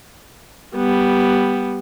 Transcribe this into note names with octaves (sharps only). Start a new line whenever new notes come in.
G3 B3